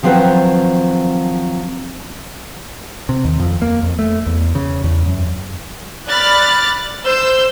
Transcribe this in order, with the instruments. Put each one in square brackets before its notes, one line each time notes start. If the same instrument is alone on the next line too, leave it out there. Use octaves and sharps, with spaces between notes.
[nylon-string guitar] D#3 F3 F#3 C4 B4 C5
[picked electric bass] C3
D#2
F2
A#3
F2
A3
E2
C#3
E2
F#2
[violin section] D5 B5 F6 F#6 A6
C5 E6 G6